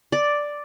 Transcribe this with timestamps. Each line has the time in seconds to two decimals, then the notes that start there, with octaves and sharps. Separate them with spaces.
0.12 D5